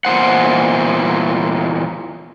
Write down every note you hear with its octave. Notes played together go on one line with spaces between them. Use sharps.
E2 A#2 C5 F#5